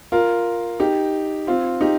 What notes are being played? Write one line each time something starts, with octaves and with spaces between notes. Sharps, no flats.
F4 A#4
D#4 G4
C4 F4
D#4 G4